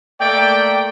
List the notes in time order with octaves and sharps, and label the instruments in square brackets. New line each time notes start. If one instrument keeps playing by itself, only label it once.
[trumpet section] A3 A#3 D5 [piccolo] G5